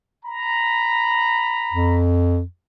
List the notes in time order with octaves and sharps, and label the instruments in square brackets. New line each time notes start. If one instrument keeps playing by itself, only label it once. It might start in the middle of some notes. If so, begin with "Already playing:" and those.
[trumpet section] A#5 B5
[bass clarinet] F2